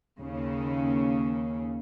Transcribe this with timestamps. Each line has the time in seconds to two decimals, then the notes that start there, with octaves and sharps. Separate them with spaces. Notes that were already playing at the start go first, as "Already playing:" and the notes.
0.19 D#2 C#3